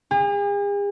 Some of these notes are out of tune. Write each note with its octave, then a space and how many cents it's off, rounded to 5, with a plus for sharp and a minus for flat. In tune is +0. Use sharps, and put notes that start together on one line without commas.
G#4 -45